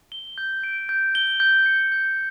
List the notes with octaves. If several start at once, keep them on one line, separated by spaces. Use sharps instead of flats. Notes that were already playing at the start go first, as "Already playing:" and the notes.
G7
G6
D7
G6
G7
G6
C#7
G6